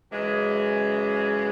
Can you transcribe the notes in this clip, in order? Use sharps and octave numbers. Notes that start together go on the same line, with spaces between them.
F#2 C#3 E3 G#3